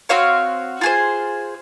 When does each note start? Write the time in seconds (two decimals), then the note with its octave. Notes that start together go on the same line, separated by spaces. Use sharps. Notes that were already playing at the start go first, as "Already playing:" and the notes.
0.09 C4 F#4 C#5 F5
0.81 F4 G#4 C5